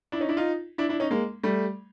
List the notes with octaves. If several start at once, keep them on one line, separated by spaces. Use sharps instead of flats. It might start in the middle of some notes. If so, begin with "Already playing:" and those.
D4 E4
C#4 D#4
D4 E4
D#4 F4
D4 E4
D4 E4
C#4 D#4
G#3 A#3
G3 A3